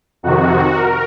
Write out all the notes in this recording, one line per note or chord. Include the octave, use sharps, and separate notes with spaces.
F2 C3 D#3 F#4
A#4